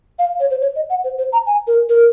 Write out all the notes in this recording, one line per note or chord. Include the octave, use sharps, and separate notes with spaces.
F5
C#5
C5
C#5
D#5
F#5
C5
C5
A#5
G#5
A#4
A#4